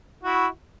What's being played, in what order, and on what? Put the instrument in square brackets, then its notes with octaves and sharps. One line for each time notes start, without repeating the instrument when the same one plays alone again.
[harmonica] E4 F#4